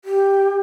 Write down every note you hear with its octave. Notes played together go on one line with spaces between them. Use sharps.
G4